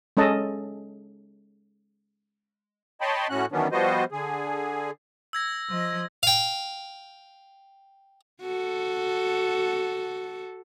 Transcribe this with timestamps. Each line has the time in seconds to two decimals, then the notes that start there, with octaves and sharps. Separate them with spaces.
0.17 G#3 C#4 A4 D#5 A5
3.01 C#5 D#5 G5 A5 B5 C6
3.30 A2 C#4 F#4 F#6
3.52 D#3 E3 F#3 B3 C#4 D4
3.72 F3 G3 B3 F#4 C5 D#5
4.12 D3 G#4
5.33 E6 G#6 A#6
5.69 F3 D#5
6.23 F5 G5
8.42 F#4 A4